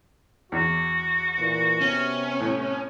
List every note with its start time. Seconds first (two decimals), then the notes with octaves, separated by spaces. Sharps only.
0.52 E2 F#4
1.39 A#2 E3
1.81 C3 B3 C#4
2.40 A2